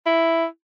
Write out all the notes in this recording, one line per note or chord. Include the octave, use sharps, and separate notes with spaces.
E4